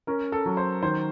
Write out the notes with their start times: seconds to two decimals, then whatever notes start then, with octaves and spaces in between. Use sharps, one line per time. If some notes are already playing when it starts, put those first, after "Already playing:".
0.07 C#4 A#4
0.32 A4
0.46 F#3
0.57 C5
0.83 D#3 C5